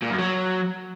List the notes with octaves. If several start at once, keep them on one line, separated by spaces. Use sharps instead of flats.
A#2
F#2
F#3